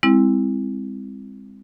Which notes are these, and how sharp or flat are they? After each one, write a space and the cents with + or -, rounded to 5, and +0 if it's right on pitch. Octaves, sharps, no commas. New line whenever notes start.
G#3 -40 C4 +0 E4 +0